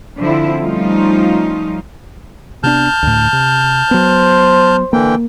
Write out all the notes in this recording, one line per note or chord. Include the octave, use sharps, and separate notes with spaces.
D3 F3 C4 E4
F3 G3 A3 C#4 D#4 F4
C3 B3 D4 A5 F6 G6
D2 A2
C3
F#3 B3 C5
D3 E3 A#3 G5